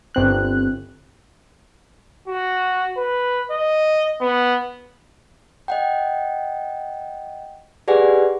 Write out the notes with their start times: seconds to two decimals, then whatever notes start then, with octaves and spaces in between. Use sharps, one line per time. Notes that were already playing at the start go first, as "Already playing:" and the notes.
0.15 G1 C4 F#6
2.28 F#4
2.97 B4
3.51 D#5
4.21 B3
5.68 D#5 F#5 G5
7.88 G4 G#4 B4 D5 F#5 G#5